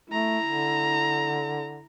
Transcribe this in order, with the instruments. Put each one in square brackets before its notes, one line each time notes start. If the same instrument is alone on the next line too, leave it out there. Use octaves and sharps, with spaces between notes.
[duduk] A3 [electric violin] E4 A#5
[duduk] D3